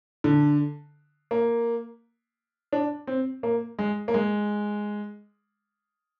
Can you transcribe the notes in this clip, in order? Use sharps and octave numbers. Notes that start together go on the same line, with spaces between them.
D3
A#3
D4
C4
A#3
G#3
A#3
G#3